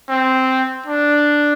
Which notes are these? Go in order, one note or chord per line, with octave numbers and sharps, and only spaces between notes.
C4
D4